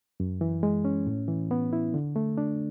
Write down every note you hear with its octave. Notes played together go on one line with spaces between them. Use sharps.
F#2
E3
G#3
C#4
A2
E3
B3
E4
D3
A3
D4